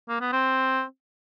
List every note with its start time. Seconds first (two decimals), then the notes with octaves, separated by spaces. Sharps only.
0.09 A#3
0.21 B3
0.32 C4